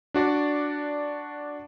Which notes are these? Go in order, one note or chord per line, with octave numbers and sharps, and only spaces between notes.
D4 F#4 D5